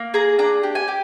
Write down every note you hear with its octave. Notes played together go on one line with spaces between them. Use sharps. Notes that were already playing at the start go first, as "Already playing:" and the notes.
Already playing: A#3
G#4 A#5
D4 A#5
G4
G#5
G4